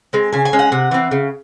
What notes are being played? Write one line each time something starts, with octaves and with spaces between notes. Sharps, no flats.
G#3 C4
C#3 G#5
G#5
G#3 C#4
F#5
C3
E3 C4
C#3